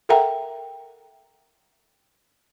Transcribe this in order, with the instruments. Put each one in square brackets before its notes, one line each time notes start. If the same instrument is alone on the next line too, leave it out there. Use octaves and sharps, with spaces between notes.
[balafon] A4 A#4 E5 F#5 G5 A#5